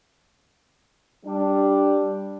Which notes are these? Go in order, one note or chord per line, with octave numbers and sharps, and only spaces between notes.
G3 D4